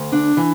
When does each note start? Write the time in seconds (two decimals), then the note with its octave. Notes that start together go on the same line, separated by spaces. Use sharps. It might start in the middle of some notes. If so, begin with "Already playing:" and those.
Already playing: D2
0.12 D4
0.37 E3